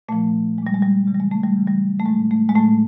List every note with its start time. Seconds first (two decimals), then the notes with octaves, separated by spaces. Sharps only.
0.08 A#2 F3 A3
0.58 F3 G#3
0.62 A#2 G3
0.74 G#3
0.82 G3
1.07 C#3 E3 G#3
1.14 G3
1.20 G#3
1.31 A3
1.44 G3
1.57 C#3 E3
1.67 G3
1.99 A3
2.06 A2 F#3 G#3
2.31 A3
2.49 G#3
2.55 A2 F#3 A3